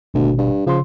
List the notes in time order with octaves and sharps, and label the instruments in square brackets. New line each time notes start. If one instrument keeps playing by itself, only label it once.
[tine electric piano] G#1 B2 [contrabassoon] D2
[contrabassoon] G2
[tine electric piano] C#3 C6 [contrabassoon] F3